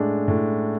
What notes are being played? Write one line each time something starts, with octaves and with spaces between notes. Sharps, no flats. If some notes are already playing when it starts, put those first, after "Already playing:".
Already playing: A2 G#3 D4
A2